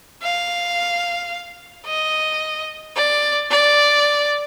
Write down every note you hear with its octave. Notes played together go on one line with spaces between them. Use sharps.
F5
D#5
D5
D5